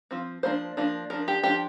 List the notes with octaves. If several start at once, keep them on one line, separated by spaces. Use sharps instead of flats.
F3 C4
F3 A#3 D4 C5
F3 A#3 D4
F3 D4 A#4
G4
F3 D4 G4